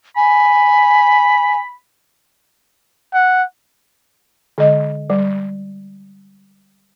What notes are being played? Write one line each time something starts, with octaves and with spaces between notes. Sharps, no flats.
G#5 B5
F#5
D3 G#3 D#5
G3